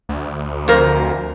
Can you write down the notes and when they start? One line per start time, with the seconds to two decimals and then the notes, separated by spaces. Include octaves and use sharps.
0.09 D2
0.68 F2 A#4 C5